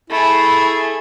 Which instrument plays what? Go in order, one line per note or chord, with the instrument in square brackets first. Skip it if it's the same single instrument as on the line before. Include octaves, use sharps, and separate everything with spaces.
[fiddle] A3 G#4 [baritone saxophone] E4